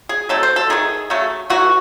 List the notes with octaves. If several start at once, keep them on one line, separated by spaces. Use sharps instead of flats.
G#4
F#3 A3 C4 D#4 A4
C5
A4
D#3 A3 D#4 G#4
C#3 F#3 A3 C#4
E3 A3 D#4 F#4